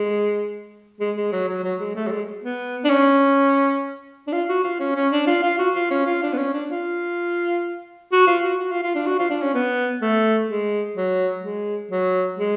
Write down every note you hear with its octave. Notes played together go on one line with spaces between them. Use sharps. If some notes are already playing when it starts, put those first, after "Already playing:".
Already playing: G#3
G#3
G#3
F#3
F#3
F#3
G#3
A3
F#3
G#3
B3
D4
C#4
D4
F4
F#4
F4
C#4
C#4
D4
F4
F4
F#4
F4
C#4
F4
D4
B3
C#4
D4
F4
F#4
F4
F#4
F#4
F4
F4
D4
F#4
F4
D4
C#4
B3
A3
G#3
F#3
G#3
F#3
G#3